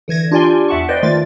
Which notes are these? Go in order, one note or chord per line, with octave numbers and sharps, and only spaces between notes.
D3 E3 G#6 A#6
D4 F4 G4 D5 G#5 C6
E2 E5 F#5 A5 C#6
B4 C5 D5 D#5 G5
D#3 A3 F4 D5 A6